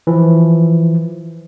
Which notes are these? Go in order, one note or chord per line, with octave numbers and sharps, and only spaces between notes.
E3 F3